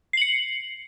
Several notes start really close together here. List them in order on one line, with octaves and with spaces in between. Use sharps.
C7 F#7 C#7